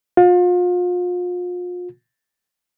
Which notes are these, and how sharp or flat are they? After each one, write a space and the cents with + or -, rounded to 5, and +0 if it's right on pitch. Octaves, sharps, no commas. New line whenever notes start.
F4 +35